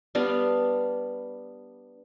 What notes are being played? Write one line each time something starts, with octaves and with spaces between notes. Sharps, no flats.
G3 B3 D4 F5